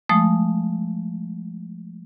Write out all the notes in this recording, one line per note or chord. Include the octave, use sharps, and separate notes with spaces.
F3 G#3 A3 D#6